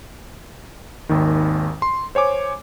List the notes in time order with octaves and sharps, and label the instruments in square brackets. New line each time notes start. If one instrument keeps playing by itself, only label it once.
[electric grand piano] G#1 D#2 D#3
C6
C5 C#5 G#5 D6